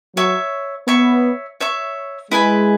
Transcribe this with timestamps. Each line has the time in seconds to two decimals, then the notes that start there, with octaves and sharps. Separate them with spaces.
0.16 F#3 C#5 E5 C#6
0.88 B3 C#5 E5 C#6
1.60 C#5 E5 C#6
2.31 G#3 E4 B4 G#5 B5